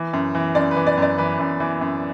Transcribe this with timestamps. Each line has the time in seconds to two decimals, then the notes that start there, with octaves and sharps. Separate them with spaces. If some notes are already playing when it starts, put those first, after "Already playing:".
Already playing: E3
0.13 F#2
0.35 E3
0.55 F#2 D5
0.71 B4
0.77 E3
0.87 D5
0.98 F#2 D5
1.18 E3 B4
1.39 F#2
1.60 E3
1.81 F#2